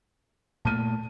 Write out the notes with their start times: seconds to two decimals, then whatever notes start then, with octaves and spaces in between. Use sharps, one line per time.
0.65 A#2 A3 A5 F6 D#7